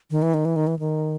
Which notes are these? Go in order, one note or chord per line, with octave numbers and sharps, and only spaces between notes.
D#3
E3
D#3
E3
D#3
E3
D#3